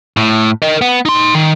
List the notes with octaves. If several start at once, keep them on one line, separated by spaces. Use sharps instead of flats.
A2
A#4 D#5
B3
D#4 C6
D#3